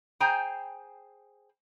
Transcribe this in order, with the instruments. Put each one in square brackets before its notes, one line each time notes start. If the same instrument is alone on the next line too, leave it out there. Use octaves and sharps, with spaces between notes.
[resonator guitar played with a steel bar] G#4 C5 G5 G#5 A#5